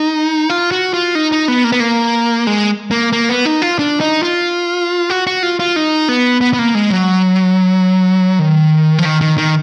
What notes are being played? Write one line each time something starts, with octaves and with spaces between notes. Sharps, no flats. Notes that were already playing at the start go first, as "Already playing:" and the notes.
Already playing: D#4
F4
F#4
F4
D#4
D#4
B3
A#3
B3
A#3
G#3
A#3
A#3
B3
D#4
F4
D4
D#4
F4
F#4
F#4
F4
F4
D#4
B3
B3
B3
A#3
G#3
F#3
D#3
F3
D#3
D#3
D#3